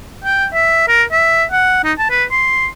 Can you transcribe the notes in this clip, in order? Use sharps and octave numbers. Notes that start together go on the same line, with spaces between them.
G5
E5
A#4
E5
F#5
D#4
A5
B4
C6